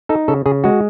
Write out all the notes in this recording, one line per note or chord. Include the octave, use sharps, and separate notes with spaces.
D#4 A4
C#3 A4
C#3 G#4
G#3 F#4